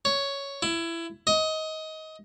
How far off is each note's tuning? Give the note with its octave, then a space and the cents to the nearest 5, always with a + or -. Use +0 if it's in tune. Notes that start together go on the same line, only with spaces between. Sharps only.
C#5 +5
E4 +20
D#5 +20